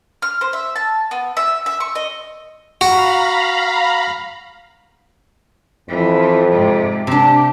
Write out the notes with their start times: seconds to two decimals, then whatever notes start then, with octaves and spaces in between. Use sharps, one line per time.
0.22 F6
0.41 C5
0.53 E5
0.76 A5
1.11 B3
1.37 E5
1.66 E5
1.80 C#6
1.95 D#5
2.81 F#4 F5 A#5 B5
5.89 F2 E3
6.52 G#2 C3
7.07 C3 D4 G4